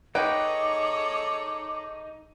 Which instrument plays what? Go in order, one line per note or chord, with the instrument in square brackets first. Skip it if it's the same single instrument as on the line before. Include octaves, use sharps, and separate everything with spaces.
[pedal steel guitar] D#4 [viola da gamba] G#4 A4 C#5 [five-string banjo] B4 G5 [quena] D6